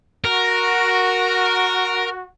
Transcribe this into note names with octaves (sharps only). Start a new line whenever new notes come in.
F#4 A#4